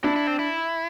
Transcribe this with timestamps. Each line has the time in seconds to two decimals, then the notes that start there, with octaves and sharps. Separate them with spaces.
0.04 D4 E4
0.16 E4
0.27 C4
0.39 E4